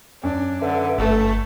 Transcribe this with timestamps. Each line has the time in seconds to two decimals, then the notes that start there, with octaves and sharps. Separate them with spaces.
0.23 F#2 D4
0.62 D3 A4 B4 E5
0.98 G1 A3